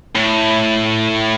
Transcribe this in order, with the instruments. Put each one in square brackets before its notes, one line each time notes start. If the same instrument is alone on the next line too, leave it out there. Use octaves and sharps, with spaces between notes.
[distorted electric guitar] A2